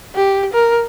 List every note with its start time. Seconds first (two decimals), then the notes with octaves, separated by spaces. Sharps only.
0.15 G4
0.53 A#4